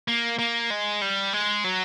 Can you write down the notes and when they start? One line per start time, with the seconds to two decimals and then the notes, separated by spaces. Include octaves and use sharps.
0.08 A#3
0.39 A#3
0.70 G#3
1.01 G3
1.33 G#3
1.64 F#3